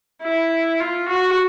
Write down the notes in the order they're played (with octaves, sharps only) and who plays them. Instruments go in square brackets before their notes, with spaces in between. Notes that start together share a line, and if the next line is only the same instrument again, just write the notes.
[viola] E4
F4
F#4